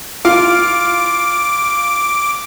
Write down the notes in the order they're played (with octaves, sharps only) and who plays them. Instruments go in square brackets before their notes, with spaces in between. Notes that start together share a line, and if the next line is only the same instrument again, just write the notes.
[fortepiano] F4 [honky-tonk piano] F5 [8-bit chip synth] D6